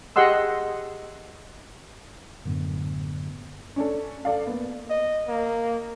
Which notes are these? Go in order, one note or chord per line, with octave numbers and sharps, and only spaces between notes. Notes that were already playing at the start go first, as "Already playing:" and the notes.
G4 G#4 D#5 F#5 C6 E6
F#2 A2 D3 B3
C#4 D4 A4
A4 D5 F5
A#3 B3
D#5
A#3